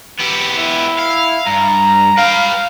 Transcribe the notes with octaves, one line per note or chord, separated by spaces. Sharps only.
B3 G4
E4
F5
G2 A#5
B4 F5 G5